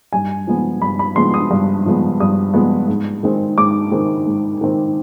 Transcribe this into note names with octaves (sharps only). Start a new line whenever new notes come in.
G2 G#5
F3 G#3 B3
G2 B5
B5
F3 G#3 B3 C6
D#6
G2
F3 G#3 B3
G2 D#6
F3 G#3 B3
G#2
D#3 G#3 C4
G#2 D6
D#3 G#3 C4
G#2
D#3 G#3 C4